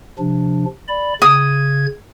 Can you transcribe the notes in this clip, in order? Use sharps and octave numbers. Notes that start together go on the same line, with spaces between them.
C3 F3 D4
D5 B5
C#3 D#6 G#6